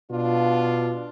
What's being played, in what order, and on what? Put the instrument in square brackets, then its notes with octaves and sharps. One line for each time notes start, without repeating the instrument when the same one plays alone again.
[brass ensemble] B2 D4 F4